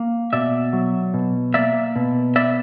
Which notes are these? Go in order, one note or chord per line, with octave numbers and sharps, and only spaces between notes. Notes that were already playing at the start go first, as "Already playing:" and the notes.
Already playing: A#3
B2 D5 E5
F#3
B2
A#3 D5 E5
B2
B3 D5 E5